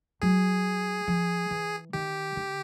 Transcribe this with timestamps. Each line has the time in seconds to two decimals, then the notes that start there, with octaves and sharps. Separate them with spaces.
0.22 F#3 G#4
1.07 F3
1.51 E3
1.93 D#3 G4
2.37 D3